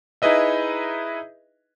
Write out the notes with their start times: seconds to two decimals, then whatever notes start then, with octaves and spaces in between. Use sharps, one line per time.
0.22 D#4 E4 G#4 B4 D#5 E5